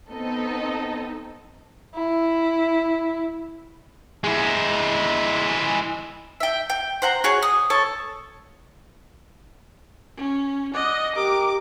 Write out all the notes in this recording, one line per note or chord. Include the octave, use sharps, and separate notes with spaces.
B3 C4 D#4 A4 D#5
E4
G#3 E4
E5 G5
G5
C5 F#5 A#5
F#4 G#4 C#5
D#6
A4 C#5 A5
C#4
D5 D#5 F#5
G4 A#4 D#5 D6